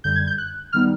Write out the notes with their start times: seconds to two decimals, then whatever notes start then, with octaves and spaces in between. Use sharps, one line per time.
0.04 F#2 D3 G3 G6
0.16 G#6
0.27 G6
0.38 F#6
0.73 D#3 G3 B3 D#4 F6